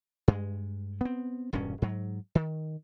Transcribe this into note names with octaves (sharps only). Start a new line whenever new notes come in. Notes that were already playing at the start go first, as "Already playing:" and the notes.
G2 G#3
B3 C4
E1 G2 A#2 C#4
G#2 F#3
D#3